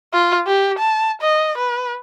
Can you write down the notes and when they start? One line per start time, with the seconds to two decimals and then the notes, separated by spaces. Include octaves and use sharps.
0.13 F4
0.47 G4
0.78 A5
1.21 D#5
1.57 B4